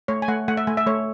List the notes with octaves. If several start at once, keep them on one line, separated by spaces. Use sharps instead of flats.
A3 C#5
G#5
A3 F#5
A3 F#5
E5
A3 G#5
E5
A3 C#5